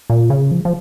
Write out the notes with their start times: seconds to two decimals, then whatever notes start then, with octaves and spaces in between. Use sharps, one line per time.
0.10 A#2
0.30 C#3
0.51 F3
0.65 F3